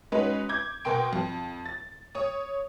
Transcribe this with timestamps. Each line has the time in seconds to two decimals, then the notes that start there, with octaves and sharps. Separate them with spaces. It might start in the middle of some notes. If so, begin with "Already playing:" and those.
0.12 G#3 C#4 D#4 F#4 B4
0.49 D6 G6 G#6
0.85 B2 F#4 A#4 G5 C6 D7
1.13 F2
1.66 A6
2.15 C#5 D#6